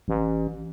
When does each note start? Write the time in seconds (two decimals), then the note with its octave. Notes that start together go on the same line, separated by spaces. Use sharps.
0.08 A1